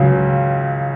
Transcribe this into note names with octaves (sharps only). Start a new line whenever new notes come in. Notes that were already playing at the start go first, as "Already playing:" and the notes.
Already playing: C#2 C#3 F#3